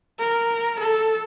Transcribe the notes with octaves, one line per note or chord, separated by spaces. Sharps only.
A#4
A4